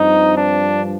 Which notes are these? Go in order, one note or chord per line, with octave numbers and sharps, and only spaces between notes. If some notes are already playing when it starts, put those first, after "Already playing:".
Already playing: G2 F3 C4 D#4
D4